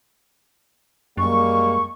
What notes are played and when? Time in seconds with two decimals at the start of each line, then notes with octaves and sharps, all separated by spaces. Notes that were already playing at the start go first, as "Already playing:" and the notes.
1.17 F#2 G3 G#3 A#3 C#6